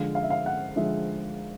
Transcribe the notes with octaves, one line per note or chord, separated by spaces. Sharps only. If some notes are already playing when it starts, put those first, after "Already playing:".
Already playing: D3 F3 G#3 F5
F5
E5
F5
F#5
D3 F3 G#3 E5